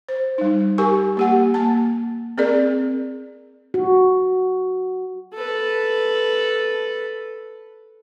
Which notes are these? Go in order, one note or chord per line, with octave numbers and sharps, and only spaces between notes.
C5
G3 D#4
G4 A#4 G#5 C#6
A#3 G4 F#5
A#3 A5
C4 G#4 A#4 D5
F#4
A4 B4